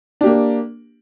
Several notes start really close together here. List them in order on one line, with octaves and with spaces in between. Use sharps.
D4 G4 A#3